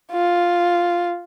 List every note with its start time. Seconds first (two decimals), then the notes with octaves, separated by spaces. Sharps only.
0.12 F4